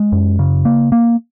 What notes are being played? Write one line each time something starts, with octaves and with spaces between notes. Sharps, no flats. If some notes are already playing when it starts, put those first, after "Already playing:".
Already playing: G#3
F#2
C#3
A#3
A#3